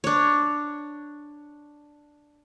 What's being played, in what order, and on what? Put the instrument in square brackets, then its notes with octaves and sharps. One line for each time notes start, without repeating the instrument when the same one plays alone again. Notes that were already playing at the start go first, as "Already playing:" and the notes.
[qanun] D4 C#5